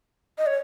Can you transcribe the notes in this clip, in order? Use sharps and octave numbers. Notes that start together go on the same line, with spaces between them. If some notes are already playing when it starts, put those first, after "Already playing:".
D#5
C#5